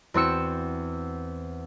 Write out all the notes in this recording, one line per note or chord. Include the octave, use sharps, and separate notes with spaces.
E2 C4 F#4 E6 C#7 E7